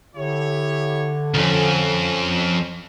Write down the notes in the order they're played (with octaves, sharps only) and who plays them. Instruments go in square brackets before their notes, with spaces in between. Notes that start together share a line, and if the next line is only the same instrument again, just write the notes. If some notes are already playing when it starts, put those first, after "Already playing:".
[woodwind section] D3 [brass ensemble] E4 G4 C#5
[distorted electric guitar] C2 F2 [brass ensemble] C#4